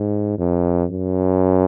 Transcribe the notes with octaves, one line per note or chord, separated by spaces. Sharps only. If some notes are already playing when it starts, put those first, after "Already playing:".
Already playing: G#2
F2
F#2